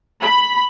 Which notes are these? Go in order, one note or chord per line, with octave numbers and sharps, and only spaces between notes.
B5